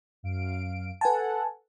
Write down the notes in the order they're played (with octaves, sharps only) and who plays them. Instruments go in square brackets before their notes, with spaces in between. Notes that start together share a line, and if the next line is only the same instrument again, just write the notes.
[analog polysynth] F#2 F5 D7
[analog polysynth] A4 F#5 [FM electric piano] B4 G#5 A5